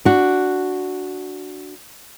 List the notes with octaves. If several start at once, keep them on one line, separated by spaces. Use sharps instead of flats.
D4 F#4